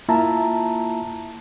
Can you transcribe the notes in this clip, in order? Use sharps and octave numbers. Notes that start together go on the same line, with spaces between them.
A#3 E4 F4 E5 A5 A#5